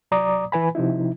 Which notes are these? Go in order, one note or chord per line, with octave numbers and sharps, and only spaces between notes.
C2 F#3 D5 A#5 D6 D#6
E3 B4 G#5 B5
C3 F3 D#4 E4